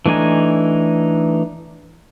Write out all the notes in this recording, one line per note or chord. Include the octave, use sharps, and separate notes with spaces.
E3 A3 D4 D#4 G#5